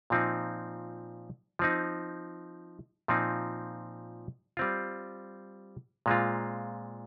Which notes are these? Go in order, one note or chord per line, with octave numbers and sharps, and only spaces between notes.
A#2 F3 C4 D#4
F3 C4 D#4
A#2 F3 C4 D#4
G3 C4 F4
A#2 G#3 C4 F4